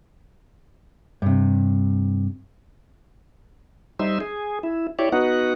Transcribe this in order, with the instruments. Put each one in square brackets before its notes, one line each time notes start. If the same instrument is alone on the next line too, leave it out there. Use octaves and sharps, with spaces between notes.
[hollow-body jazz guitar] G2 C3
[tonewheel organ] G3 D#4 C5 E5
G#4
E4
E4 G4 C#5 D5
B3 D#4 F#4 F#5